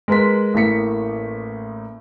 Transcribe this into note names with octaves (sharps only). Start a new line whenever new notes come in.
G#3 A#4 B4 C6 B6
A1 A2 A#3 B6 C#7